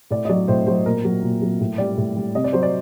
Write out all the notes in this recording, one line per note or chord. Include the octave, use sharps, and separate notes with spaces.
A2 D5
D#5
F#3 D5
A2 C5
F#3 C5
A#2 A#4
F#3
A#2
F#3
A2
G3 D5
A2
G3
C3 D#5
D5
F#3 C5
D5